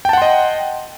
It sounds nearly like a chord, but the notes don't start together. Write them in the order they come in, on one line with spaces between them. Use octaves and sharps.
G5 A5 F#5 C6 D#5